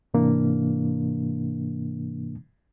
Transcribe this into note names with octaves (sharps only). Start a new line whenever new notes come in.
G#2 C3 E3 A#3 D4